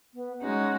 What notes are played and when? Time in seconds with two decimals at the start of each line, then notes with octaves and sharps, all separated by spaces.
0.14 B3
0.41 G#3 C#4 D#4 F#4